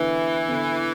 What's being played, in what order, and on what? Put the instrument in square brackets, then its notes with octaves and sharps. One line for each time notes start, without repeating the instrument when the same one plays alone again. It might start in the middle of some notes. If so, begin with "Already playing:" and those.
Already playing: [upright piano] D3 B3 E4 A4 [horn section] E3
[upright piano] D3 B3 E4 A4